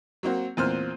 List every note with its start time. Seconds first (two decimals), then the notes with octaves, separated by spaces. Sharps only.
0.23 F#3 A#3 C4 F#4
0.57 E2 A#2 C4 C5 F6 F#6